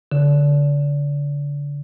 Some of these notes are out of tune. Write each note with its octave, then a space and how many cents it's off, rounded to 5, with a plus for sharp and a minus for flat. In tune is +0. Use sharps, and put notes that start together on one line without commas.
D3 -35